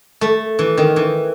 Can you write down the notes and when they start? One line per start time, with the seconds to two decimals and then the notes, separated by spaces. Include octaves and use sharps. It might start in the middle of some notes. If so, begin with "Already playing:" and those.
0.21 A3
0.59 E3
0.77 D#3
0.96 E3